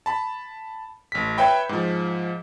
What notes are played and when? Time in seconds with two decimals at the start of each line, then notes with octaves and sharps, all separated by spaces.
0.06 A5 B5
1.12 A1 B6
1.38 B4 C#5 E5 G5 B5
1.69 G#2 F3